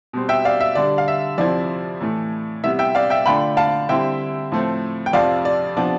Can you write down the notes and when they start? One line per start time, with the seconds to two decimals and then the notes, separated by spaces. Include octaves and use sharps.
0.13 B2 G3 C4
0.29 E5 G5
0.45 D5 F5
0.61 E5
0.75 D3 G3 D4 D5
0.98 F5
1.08 E5
1.38 F2 C3 F3 C4 E4 D5
2.01 A2 E3 A3
2.63 C3 G3 B3 E4 E5
2.79 E5 G5
2.95 D5 F5
3.10 E5 G5
3.26 D3 A3 D4 F4 G5 B5
3.57 F5 A5
3.89 D3 G3 C4 E4 E5 G5
4.52 A2 F3 A3 C4
5.06 G5
5.13 F2 C3 F3 C4 D5 F5
5.45 D5
5.77 C3 F3 B3 D4 D5